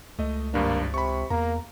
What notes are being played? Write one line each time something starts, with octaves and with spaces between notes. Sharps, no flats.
C#2 A3 D#5
G#1 G2 A#3 D4
C3 B5 C#6
E2 A#3 A#5